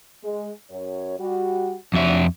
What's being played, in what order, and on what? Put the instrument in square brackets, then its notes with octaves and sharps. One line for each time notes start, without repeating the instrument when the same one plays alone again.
[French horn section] G#3
F#2 C#5
G3 F#4
[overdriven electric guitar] F2 E5 [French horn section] F#3 C4 D4